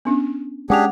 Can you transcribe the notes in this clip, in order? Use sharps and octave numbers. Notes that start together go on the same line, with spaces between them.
B3 C#4 D4
G#3 C#4 D4 G4 G#4 F#5 D6 F7